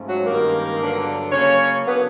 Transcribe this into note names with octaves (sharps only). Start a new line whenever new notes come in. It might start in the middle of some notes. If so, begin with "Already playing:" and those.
Already playing: G#2 F3 A3 C#4
F#3 F#4
G2 D#3 G#3 A#3 C#4 A#4
G2 D3 F#3 B3 D4
C#3 F#3 A#3 C#4 C#5
C#3 F#3 A#3 B3 D4 B4